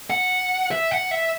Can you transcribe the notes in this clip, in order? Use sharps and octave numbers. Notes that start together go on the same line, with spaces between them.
F#5
E5
F#5
E5